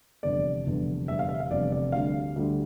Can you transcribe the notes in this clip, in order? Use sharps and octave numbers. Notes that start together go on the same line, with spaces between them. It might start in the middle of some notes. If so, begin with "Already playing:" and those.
F1 E2 D3 G3 D5
F1 E2 D3 G3
F1 E2 D3 G3 E5
F5
E5
F5
F1 E2 D3 G3 D5
D5
D2 D3 G3 F5
D2 D3 G3